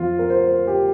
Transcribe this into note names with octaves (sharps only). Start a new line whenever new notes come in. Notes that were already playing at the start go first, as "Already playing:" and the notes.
Already playing: F2 F3 F4
A#4
C5
G4